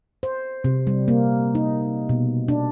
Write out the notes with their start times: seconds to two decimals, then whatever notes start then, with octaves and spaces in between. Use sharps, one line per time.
0.23 C5
0.64 C3
0.87 G3
1.08 A#3
1.55 D#4
2.09 B2
2.48 D4